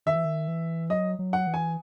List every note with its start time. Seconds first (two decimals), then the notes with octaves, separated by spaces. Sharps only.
0.06 D#3 E5
0.16 E3
0.25 D#3
0.48 E3
0.90 F#3 D#5
1.19 F#3
1.33 F#5
1.47 E3
1.54 G#5